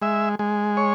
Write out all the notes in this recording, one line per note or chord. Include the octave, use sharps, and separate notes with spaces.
G#3 E5
G#3
C#5